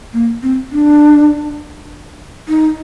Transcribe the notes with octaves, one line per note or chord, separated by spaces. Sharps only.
A#3
C4
D4
D#4